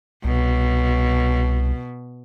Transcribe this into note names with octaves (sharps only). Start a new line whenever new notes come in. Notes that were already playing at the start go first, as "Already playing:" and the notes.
C2 B2